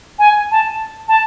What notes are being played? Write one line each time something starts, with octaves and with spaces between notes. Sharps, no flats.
G#5
A5
A5